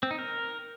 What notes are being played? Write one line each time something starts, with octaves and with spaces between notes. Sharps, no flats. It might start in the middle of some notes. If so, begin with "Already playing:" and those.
C4
D#4
A#4